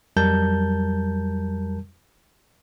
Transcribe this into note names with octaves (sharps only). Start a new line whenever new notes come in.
F2 F#3 G3 A#4 A5 G6